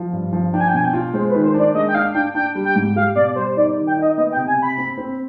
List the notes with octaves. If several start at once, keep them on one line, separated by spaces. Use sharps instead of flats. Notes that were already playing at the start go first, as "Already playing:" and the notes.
Already playing: F3
G2
F3
D4 G5
G#5
G5
B2 G#5
G5
F4
G#3 C5
B4
D#3
C5
D4 D5
G#3 D#5
G5
D4 F5
D4 G5
D4 G5
G3
G5
G#2
G4 F5
B2 D5
G3 C5
D#4 D5
D#3
G5
D#4 D#5
B3 D#5
G5
C3
G#5
C3 B5
C4
C4